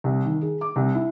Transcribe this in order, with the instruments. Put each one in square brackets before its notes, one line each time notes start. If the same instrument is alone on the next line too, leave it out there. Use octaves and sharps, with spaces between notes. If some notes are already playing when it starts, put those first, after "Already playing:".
[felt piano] C2
D#3
G#4
D6
C2
E4